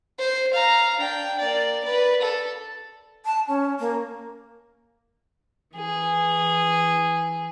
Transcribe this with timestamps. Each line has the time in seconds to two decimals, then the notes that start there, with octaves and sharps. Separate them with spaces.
0.19 C5
0.54 F5 A#5
0.99 D4 G5
1.39 A#3 D5
1.84 B4 D5
2.21 A4
3.25 A5
3.48 C#4
3.80 A#3
5.76 E3 G#4